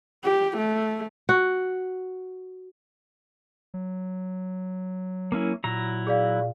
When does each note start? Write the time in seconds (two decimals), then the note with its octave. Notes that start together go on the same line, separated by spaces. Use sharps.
0.24 G4
0.57 A3
1.29 F#4
3.74 F#3
5.32 A#3 C#4 E4
5.64 A#2 F#3 E4 A#5
6.07 G#4 D5 F5